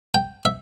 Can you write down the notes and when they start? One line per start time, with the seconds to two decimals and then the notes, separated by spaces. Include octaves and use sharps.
0.14 G5
0.45 E5